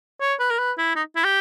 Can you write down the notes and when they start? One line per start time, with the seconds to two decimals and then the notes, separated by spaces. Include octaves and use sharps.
0.21 C#5
0.39 B4
0.51 A#4
0.59 B4
0.78 E4
0.96 D#4
1.16 E4
1.24 G4